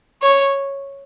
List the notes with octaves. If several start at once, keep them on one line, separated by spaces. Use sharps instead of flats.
C#5